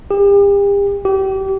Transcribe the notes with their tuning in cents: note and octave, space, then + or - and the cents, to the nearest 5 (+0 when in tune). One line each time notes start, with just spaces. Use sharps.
G4 +40
G4 -30